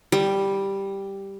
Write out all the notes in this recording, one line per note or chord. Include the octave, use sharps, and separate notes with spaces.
G3